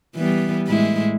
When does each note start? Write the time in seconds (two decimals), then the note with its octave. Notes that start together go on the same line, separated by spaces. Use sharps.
0.16 E3 G3 B3
0.67 A2 G#3 E4